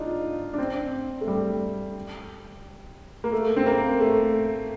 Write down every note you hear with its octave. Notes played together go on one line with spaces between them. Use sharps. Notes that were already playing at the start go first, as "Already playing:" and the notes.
Already playing: D4 D#4 F4
D4
C4
A3
G3
A#3
A3
C4
A#3
A3